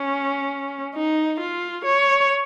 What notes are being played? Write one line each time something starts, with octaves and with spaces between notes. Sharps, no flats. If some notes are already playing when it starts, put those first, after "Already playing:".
Already playing: C#4
D#4
F4
C#5